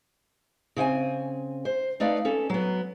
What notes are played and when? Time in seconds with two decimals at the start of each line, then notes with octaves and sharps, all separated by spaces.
0.77 C#3 C4 F5 G#5
1.65 C5
2.00 A3 D#4 B4 D5 F5
2.25 C#4 A4
2.50 F#3 B3